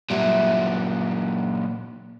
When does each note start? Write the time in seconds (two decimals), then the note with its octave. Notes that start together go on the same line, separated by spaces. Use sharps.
0.10 A#2 F#3 G3 E5